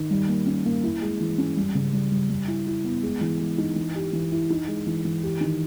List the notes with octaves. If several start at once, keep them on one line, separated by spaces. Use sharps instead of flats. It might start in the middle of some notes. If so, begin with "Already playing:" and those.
Already playing: D#3
G3
A#3
C#4
A#3
E4
G#3
E3
C#4
G3
C#3
G3
G3
G3
E4
E4
B3
G#3
E3
G#3
D#4
E3
G4
E3
E4
D#4
G#3
E3
E3
G4
D#3